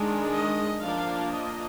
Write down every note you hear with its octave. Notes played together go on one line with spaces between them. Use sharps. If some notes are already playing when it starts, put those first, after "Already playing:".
Already playing: D#3 G#3 D4
D#5
F3 A#3 D4 F5
D#5